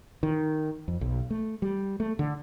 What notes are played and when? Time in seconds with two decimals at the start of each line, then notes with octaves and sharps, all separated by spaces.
0.23 D#3
0.88 F2
1.01 B1
1.30 A3
1.62 G3
2.00 A3
2.19 D3